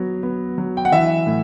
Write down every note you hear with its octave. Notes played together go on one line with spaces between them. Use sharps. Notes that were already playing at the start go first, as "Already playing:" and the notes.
Already playing: F#3 B3
B3
F#3
G5
F#5
E3 E5
A2